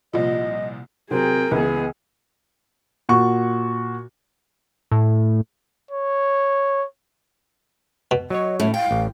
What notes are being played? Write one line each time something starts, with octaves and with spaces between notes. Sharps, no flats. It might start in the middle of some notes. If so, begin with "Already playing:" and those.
C2 A#2 F3 D#5
C3 F#3 C4 G#4 A#4 G5
C#2 E3 B3 G#4
A#2 F#4 C#6
A2
C#5
B2
F#3 C#5 D#5
A2 C#4 E5
F5 G5
A1